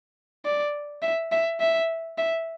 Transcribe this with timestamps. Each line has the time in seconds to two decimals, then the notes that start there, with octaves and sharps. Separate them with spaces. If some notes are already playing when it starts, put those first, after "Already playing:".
0.45 D5
1.02 E5
1.32 E5
1.60 E5
2.18 E5